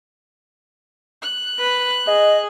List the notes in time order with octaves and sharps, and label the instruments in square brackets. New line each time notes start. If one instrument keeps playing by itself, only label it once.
[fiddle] F#6
[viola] B4
[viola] G#4 [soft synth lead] D#5